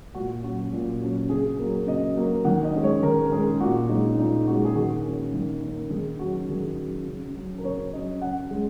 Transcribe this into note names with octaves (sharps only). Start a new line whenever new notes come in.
A#2 F#4
F#3 C#4 F#4
A#2
F#3 C#4
C#3 G#4
F#3 A#3
C#3 D#5
F#3 A#3
D#3 F#5
D#5
G#3 C#4
C#5
D#3 A#4
A#4
G#3 C#4 G#4
A#2 F#4
G#3 C#4 D#4
A#2 D#4
G#3 C#4 F#4
G#4
D#3 F#4
A#3 C#4
D#3
A#3 C#4
D#3 G#4
F#3 C#4 F#4
D#3 G#4
F#3 C#4
C#3
F#3 C#4
A#4
C#3 C#5
F#3 C#4 D#5
C#3 F#5
G#3 C#4